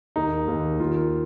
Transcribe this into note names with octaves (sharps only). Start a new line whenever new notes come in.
D#2 D#3 D#4
D#2 D#3
D#2 D#3 F4